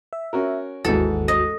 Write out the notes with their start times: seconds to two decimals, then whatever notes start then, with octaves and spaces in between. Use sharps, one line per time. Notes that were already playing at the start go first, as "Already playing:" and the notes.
0.13 E5
0.33 C#4 F#4 A#4
0.85 G#1 D#2 G#2 E3 F#4 A4
1.28 D#5